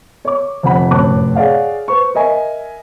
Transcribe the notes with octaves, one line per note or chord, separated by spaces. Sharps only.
C#5 D6
F1 F2 F#5 B5
F1 F#2 A2 A5 D6 F#6
G#4 C#5 D5 F5 F#5
B4 C5 C#6
A#4 D#5 E5 G#5